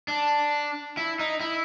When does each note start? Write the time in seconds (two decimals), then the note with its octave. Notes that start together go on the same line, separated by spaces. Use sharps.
0.08 D4
0.97 E4
1.19 D#4
1.40 E4